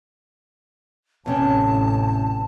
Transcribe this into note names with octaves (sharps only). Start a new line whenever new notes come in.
A1 E2 C3 C#4 A5